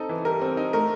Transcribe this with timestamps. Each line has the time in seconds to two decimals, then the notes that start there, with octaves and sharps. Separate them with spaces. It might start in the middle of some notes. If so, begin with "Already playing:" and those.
Already playing: C4 D#4 A4
0.09 E3
0.25 G3 A#4
0.41 C4
0.57 D#4
0.73 A3 A#4